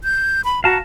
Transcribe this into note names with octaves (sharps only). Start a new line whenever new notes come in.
G6
B5
F#4 F5 A5 A#5